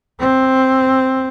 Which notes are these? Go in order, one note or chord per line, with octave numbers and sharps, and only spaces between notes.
C4